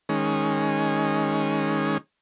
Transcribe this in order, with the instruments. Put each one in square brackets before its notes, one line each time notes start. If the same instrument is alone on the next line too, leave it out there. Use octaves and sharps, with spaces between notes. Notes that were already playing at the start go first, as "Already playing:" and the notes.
[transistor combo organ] D#3 G#3 C#4